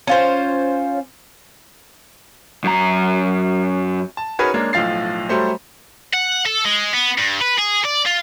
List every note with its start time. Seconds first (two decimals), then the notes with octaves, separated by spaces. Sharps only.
0.07 C#4 F4 C5
2.64 F#2 A#5
4.17 A5
4.39 C#4 D#4 F#4 G#4 A#4 B4
4.54 G#3 A#3 C#4 D4
4.73 B1 A2 F3 F5 A6 C7
5.29 F#3 G3 A3 C5
6.14 F#5
6.46 A4
6.65 G#3
6.93 B3
7.18 G2
7.42 B4
7.59 G#4
7.85 D5
8.06 F4